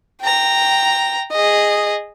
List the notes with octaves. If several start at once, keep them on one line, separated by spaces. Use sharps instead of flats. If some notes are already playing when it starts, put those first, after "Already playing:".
G5 A#5
G#4 D#5